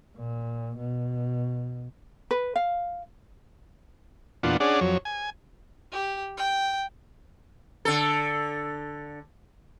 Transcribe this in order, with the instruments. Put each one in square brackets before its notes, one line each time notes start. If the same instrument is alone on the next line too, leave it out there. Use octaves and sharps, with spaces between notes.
[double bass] A#2
B2
[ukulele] B4
F5
[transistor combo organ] E2 A#2 B3 D4 F4 F#5
C#4 D4 G#4 D5 F#5
F2 F#3 C#5
G#5
[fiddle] G4
G5
[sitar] D3 A4